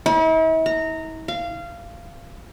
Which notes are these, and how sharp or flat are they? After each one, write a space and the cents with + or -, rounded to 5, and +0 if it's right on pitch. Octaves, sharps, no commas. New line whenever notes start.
E4 -45
A#5 -15
F5 -20